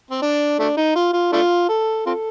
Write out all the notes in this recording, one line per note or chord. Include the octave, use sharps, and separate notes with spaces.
C4
D4
A3 D4
D#4
F4
F4
A3 D4 F4
A4
C4 F4 A4